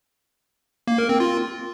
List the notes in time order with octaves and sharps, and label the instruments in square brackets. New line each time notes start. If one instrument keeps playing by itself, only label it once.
[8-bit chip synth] A#3
A#4
C4
F4